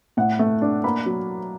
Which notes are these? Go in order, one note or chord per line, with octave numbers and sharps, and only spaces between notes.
A2 F#5
A3
D4
A#3 B5
F#3